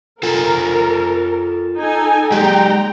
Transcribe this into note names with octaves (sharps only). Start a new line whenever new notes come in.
F4 A4 A#4 G#5
D#4 A4 G#5
G#3 G4 G5 A#5